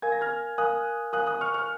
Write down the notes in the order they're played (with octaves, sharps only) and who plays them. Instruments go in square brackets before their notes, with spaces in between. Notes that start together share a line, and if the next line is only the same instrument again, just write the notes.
[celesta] A#4 F5 G#5 [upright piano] G#6
[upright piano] A#6
F6 G#6
[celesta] A#4 F5 G#5 [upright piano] D#6 F#6
[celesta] A#4 F5 G#5 [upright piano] D#6 F#6
[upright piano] D#6 F#6
C#6 F6
C#6 F6